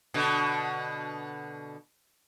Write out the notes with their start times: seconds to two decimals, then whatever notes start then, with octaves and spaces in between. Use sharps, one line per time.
0.14 B2 D3